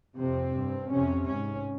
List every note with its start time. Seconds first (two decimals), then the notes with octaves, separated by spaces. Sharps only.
0.18 F2 C3 C4
0.55 G2
0.90 F2 C3 C#4
1.27 G#2 C#4